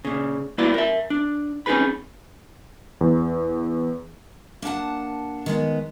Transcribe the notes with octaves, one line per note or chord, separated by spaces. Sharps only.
A#2 C#3
A#3 B3 E4 F#4 D5
A#4 E5
D4
C4 C#4 D#4 G#4 B4 B5
E2
A#3 D4 F#5 A5
D#3 G#3 B3